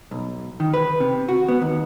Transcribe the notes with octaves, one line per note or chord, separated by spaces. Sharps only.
B1
D#3
B4
C3
F#4
B3
D#2